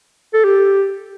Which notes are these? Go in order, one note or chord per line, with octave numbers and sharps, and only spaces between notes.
A4
G4